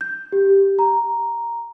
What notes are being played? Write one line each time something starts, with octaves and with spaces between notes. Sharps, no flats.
G6
G4
A#5